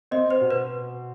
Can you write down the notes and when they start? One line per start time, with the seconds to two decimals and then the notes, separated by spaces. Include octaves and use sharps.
0.11 C4 D#5
0.30 C5
0.41 B2
0.51 B4